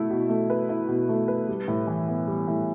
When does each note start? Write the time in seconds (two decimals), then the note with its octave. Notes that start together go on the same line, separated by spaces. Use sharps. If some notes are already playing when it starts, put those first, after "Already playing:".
Already playing: B2 A3 E4
0.10 B2
0.29 A3
0.50 B4
0.69 E4
0.88 B2
1.09 A3
1.28 B4
1.49 G3
1.68 A2
1.87 E3
2.08 B3
2.27 G3
2.48 A2